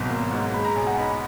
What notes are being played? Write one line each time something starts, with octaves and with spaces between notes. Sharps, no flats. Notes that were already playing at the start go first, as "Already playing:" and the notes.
Already playing: G#1 B2 F#3
A#3
G#2
G#3 B5
A#5
B1 G#5
F#5
D#4 B5